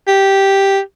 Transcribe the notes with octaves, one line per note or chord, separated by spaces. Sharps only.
G4